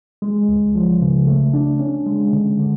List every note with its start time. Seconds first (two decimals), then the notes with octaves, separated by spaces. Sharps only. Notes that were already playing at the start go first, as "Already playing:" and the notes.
0.22 G#3
0.49 C#2
0.75 F3
1.01 C#3
1.27 A3
1.53 D4
1.80 C#4
2.06 G#3
2.33 D3
2.59 D3